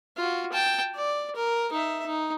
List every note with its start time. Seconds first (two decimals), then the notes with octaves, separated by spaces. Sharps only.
0.17 F4 F#4
0.52 G5 A5
0.95 D5
1.35 A#4
1.72 D#4 E5
2.06 D#4